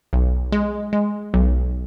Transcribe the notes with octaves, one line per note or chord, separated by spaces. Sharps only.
B1
G#3
G#3
B1